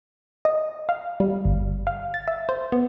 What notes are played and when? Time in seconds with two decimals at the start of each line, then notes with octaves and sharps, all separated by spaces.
0.45 D#5
0.89 F5
1.20 G3
1.45 G1
1.87 F5
2.14 A6
2.28 E5
2.49 C5
2.72 B3